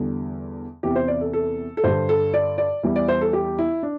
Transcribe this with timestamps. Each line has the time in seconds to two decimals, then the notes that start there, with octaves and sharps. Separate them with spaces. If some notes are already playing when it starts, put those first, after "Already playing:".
Already playing: E2 D3 G3
0.83 E2 C3 E3 G4
0.96 C5
1.08 D5
1.21 A4
1.33 A4
1.77 A4
1.84 G2 D3 G3 C5
2.09 A4
2.34 D5
2.58 D5
2.83 E2 E3 G3
2.96 D5
3.08 C5
3.21 A4
3.33 G4
3.58 E4
3.83 D4